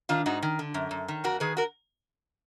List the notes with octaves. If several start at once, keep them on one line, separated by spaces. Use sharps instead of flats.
D#3 D4 F4
G#2 D#4 F#4
D#3
D3
F#2
F#2
D#3
F2 F#4 A#4
D#3 G#4 B4
F#4 A#4